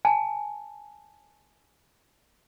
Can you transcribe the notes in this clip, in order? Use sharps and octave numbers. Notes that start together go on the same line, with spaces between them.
G#5 A5